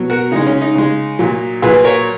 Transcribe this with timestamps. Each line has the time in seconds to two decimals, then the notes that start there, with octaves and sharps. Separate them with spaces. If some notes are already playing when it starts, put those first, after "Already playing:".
Already playing: B2 F#3
0.10 F#4 A#4
0.32 C#3 G#3 D#4
0.47 C#4
0.61 D#4
0.75 C#3 G#3
1.19 A#2 F#3
1.62 A#2 F#3 G#4 B4
1.84 A#4 C#5